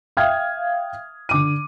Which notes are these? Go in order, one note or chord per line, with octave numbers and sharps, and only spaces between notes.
E5 F5 G5 D#6 F6 G#6
D3 D6 D#7